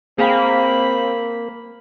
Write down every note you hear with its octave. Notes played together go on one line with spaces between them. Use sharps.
A#3 C4 G#4 F5 G5 B5